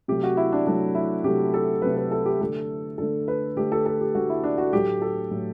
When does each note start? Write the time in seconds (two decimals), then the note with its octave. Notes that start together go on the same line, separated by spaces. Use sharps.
0.08 C3 F#3 A3 G4
0.23 F#4
0.37 E4
0.52 D4
0.67 C3 F#3 A3 D4
0.95 E4
1.24 C3 F#3 A3 G4
1.54 A4
1.82 C3 F#3 A3 B4
1.97 B4
2.11 A4
2.26 G4
2.40 D3 A3 A4
2.98 D3 A3 A4
3.28 B4
3.56 D3 A3 G4
3.72 A4
3.86 A4
4.01 G4
4.15 D3 A3 F#4
4.30 E4
4.44 D4
4.58 F#4
4.73 A2 F#3 A3 G4
5.02 A4
5.31 A2 F#3 A3